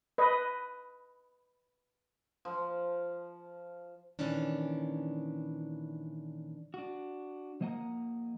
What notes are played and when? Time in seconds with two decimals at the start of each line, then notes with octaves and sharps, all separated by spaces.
0.18 B4 D#5
2.45 F3 F5
4.19 A#2 D#3 E3 C#4 D4
6.74 D4 F#4
7.61 F3 A#3 D#5 F#5 G#5 A#5